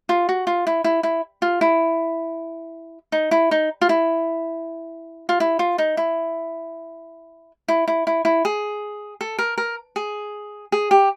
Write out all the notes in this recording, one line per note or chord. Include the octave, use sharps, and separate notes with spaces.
F4
F#4
F4
E4
E4
E4
F4
E4
D#4
E4
D#4
F4
E4
F4
E4
F4
D#4
E4
E4
E4
E4
E4
G#4
A4
A#4
A#4
G#4
G#4
G4